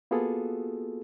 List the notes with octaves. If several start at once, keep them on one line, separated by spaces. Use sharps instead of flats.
A#3 B3 F4 F#4 G#4 A4